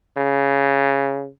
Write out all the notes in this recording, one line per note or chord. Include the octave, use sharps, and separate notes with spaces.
C#3